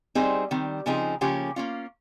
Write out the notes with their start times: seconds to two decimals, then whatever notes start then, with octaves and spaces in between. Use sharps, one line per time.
0.15 G3 C4 D#4 G#4 C5
0.51 D#3 G3 C4
0.86 C#3 F3 C4 D#4 G#4
1.21 C#3 F3 A#3 C#4 G4
1.56 A#3 C#4 F4